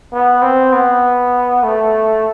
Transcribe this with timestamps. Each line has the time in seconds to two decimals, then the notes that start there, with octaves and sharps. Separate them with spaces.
0.12 B3
0.42 C4
0.73 B3
1.64 A3